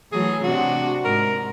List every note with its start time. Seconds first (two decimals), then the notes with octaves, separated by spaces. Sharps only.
0.12 E3 F#3 A3 G#4
0.43 C3 D4 F#4
1.05 G#2 A#4